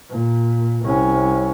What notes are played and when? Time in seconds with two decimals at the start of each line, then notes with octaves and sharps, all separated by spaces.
0.11 A#2
0.85 C2 C#4